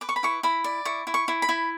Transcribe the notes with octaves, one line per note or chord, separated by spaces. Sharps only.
B4 D6
C#6
B5
E4 C#6
E4 B5
D5
E4 C#6
E4
C#6
E4
B5
E4